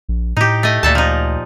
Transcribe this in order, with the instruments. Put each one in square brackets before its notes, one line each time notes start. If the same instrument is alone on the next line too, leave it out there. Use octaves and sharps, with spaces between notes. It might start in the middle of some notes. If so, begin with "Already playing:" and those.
[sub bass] A#1
[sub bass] A2 [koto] D#4 G4
[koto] A3 D#5
[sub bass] D2 [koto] A#2 A4 A5
[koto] F3 D#4